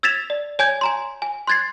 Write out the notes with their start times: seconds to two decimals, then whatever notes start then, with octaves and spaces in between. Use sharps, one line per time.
0.03 E6 G#6 A6 B6 E7 F7
0.30 D5
0.59 C#5 G#5 G6 G#6
0.81 G#5 A#5 C6
1.22 G#5
1.47 C6 F#6 G#6 A6 C7